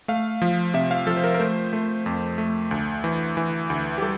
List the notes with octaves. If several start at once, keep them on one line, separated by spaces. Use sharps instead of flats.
A3 F5
F3
C3 E5
F5
F3 A4
C5
A#4
A#4
A3 C5
A3
F2
A3
D2
E3
E3
D2
G4
G3 A4